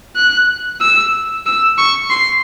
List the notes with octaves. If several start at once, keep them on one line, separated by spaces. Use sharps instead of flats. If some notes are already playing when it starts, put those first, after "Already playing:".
F#6
E6
E6
C#6
C6